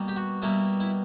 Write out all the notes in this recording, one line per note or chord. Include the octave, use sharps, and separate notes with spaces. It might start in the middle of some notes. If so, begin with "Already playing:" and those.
Already playing: B2 G3 A#3
G4
F#4
B2 G3 A#3 E4
E4